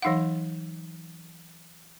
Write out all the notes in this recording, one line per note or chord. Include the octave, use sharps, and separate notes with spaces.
E3 F#3 D#4 F5 F#5